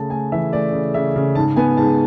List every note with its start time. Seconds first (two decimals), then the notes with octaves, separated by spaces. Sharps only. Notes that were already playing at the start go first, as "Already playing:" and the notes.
Already playing: C#3 A3 A5
0.10 A3 G#5
0.32 E3 E5
0.52 A3 D5
0.73 C#3
0.94 C#3 E5
1.16 C#3
1.35 G#2 A5
1.56 B3 G#5
1.77 G#2 A5